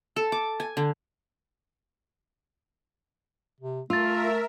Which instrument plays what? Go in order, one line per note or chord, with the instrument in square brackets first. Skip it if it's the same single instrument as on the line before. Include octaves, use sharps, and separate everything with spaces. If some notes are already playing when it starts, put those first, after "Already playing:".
[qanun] A4
D6
G#5
D3
[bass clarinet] C3
[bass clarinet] A3 [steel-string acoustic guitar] F4 [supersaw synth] A#4 E5 [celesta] E6 A6